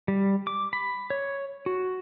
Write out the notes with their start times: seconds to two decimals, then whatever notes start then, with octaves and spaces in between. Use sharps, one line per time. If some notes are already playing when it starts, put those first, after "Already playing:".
0.08 G3
0.47 D6
0.73 B5
1.10 C#5
1.66 F#4